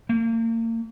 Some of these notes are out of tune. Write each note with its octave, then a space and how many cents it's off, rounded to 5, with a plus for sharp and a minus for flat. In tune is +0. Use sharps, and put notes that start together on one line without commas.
A#3 -40